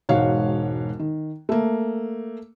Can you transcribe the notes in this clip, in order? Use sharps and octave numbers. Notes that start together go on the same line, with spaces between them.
E1 G#2 F#4 C#5 F5
D#3
A3 A#3